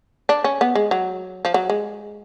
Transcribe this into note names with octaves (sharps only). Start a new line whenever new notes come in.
D4
C#4
B3
G#3
F#3
F3
F#3
G#3